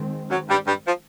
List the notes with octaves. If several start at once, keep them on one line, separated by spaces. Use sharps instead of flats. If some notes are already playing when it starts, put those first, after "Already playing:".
Already playing: D#3 G#3 C4
F#2 F#3
G2 G3
G2 G3
F3